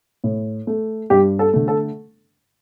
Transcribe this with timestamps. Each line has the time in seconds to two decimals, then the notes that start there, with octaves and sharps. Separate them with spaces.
0.24 A2
0.67 A3
1.10 G2 G4
1.39 A4
1.53 D3 A3
1.68 A4